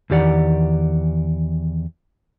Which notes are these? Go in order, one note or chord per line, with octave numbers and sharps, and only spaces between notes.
E2 D#3 G4 D5 F#5 A#5